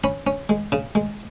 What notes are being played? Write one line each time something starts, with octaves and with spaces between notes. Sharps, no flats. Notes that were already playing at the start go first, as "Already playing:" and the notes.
C#4 B5
C#4
G#3
C#3
G#3